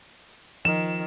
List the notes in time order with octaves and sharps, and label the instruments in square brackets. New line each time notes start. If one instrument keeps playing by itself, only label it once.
[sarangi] D#3 [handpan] F3 [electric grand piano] E7